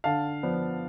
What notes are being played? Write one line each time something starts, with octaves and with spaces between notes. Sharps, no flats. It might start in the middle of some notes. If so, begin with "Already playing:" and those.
D3 F5 A5
F3 B3 D4